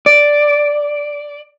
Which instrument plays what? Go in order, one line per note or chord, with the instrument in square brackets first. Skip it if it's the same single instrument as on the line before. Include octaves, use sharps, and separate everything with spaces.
[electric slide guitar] D5